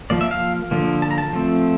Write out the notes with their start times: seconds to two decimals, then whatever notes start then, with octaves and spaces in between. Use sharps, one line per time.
0.10 F3 A#3 D5
0.21 E5
0.31 F5
0.71 D3 F3 A#3
1.02 A5
1.11 A#5
1.18 A5
1.33 F3 A3 C4